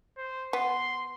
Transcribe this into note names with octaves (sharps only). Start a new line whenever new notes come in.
C5
B3 C6